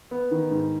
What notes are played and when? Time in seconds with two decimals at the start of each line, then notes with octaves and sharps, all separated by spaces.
0.11 B3
0.31 D#3
0.51 G#2